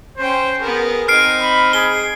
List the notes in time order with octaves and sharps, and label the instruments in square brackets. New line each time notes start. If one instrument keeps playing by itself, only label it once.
[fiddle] C#4 G5 [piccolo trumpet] C5
[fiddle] B3 A#4 [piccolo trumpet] G#4
[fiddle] C4 D#4 [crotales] F6 C7 D7
[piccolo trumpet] B5
[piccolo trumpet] G#4 [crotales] G7